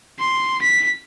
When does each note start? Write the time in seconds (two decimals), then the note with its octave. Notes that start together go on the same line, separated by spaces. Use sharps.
0.19 C6
0.61 B6